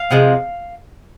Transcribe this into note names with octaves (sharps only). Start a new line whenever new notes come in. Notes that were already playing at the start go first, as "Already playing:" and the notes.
Already playing: F5
C3 F3 G#3